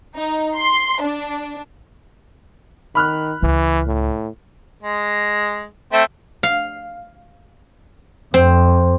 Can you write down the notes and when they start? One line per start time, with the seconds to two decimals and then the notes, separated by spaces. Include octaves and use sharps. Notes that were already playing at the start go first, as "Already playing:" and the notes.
0.15 D#4
0.56 C6
1.01 D4
2.95 D#3 B5 F6 F#6
3.42 C#2 E3
3.86 A2
4.83 G#3
5.93 A3 C4 E5
6.43 F5
8.34 F2 C4